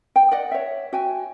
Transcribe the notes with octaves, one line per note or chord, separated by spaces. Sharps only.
G5
D5 D#5 F#5
C#5 E5
F#4 G5 G#5